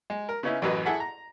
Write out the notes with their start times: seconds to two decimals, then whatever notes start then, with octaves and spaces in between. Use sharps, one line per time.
0.10 G#3
0.29 A#4
0.43 C#3 B3 C#4 D#4 E4
0.62 A1 F#2 F#3 B4 D#5
0.86 E4 G#4 A4 E5 F#5
1.00 A#5